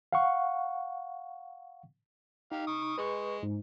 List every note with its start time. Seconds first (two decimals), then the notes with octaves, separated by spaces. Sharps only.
0.13 F5 F#5 C#6
2.52 D#4 G4 F5
2.67 C#6 D#6
2.98 G#3 B4 C#6
3.43 G#2